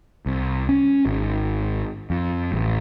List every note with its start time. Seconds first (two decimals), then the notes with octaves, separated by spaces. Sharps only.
0.26 C2
0.69 C#4
1.06 G#1
2.10 F2
2.52 A1